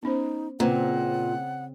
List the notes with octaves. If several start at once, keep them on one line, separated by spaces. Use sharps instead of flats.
B3 C#4 D#4 C5
A#2 C#3 C4 B4 C5 F#5 A#5